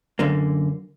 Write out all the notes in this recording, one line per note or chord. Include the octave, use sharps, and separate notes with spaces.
F#2 D3 A#3